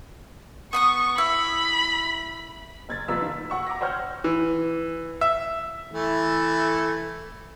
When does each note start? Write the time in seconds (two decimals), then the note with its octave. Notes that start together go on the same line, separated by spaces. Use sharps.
0.73 B3 C6 C#6 D#6
1.18 E4 B5
2.89 F#1 G#6 A6
3.08 F#1 C2 F3 B4 E6 B6
3.22 D#3 F4
3.50 F#4 F#5 C#6 E6
3.67 A#5 D6 E6 A#6
3.81 C5 C#5 F#5 G5 F6 G6
4.24 E3
5.21 E5
5.92 E3 A3